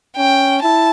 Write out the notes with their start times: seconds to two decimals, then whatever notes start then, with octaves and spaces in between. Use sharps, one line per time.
0.17 C#4 G5
0.62 E4 A5